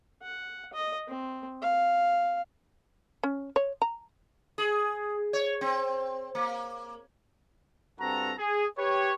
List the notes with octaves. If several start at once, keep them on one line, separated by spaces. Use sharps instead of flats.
F#5
D#5
C4
F5
C#4
C#5
A#5
G#4
C#5
C4
A#3
G2 C4 F#4 A4 A#5
G#4
G4 B4 C#5